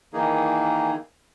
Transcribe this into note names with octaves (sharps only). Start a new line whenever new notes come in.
D#3 E3 A#3 D#4 G#4